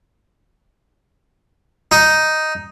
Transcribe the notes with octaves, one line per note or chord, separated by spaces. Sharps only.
D#4